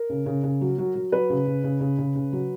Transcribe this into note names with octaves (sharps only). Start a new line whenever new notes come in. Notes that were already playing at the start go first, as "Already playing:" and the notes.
Already playing: A#4
C#3
C#3
C#3
F#3
F#3
F#3
F#3 B4
C#3
C#3
C#3
C#3
C#3
C#3
F#3